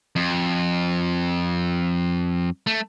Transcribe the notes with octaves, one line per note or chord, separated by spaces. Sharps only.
F2
A3